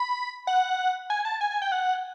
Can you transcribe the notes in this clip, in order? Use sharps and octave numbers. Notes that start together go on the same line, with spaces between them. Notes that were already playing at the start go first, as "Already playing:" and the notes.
Already playing: B5
F#5
G#5
A5
G#5
G#5
G5
F#5